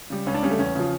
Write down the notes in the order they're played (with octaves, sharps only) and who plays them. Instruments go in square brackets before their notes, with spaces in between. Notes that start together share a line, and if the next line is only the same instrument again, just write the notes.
[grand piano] C#3 G3
[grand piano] C#2 [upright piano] C#4
[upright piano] D4
[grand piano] C#3 G3 [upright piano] C#4
[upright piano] A3
[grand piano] E2 [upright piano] C#4
[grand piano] C#3 F3